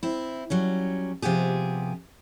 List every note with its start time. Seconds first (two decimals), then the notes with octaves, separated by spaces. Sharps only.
0.03 C4 E4
0.50 F#3 G3 C#4
1.22 C3 F3 B3 G4 G#4